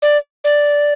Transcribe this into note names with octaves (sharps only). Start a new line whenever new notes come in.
D5
D5